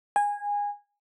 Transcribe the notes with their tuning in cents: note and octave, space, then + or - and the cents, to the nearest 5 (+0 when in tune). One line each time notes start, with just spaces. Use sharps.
G#5 -20